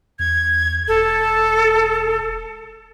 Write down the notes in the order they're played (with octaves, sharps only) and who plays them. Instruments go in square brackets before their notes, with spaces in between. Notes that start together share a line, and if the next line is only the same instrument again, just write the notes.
[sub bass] E2 [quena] G#6
[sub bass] E1 [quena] A4